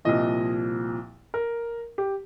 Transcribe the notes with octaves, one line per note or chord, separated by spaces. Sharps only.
C2 A#2 F3 D#5
A#4
G4